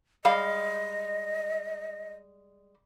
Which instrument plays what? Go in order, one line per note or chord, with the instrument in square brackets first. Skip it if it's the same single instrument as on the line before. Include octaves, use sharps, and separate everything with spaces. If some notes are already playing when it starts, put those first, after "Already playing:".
[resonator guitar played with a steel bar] G3 G#3 F5 [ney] D#5